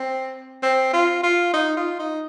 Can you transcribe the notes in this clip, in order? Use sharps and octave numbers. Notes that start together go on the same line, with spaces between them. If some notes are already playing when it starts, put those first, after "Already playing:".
Already playing: C4
C4
F4
F4
D#4
F4
D#4